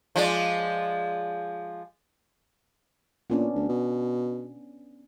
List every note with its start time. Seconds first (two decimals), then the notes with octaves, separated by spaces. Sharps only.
0.16 F3 G#3 D5
3.30 A#2 B3 C#4 D4
3.55 D2
3.69 B2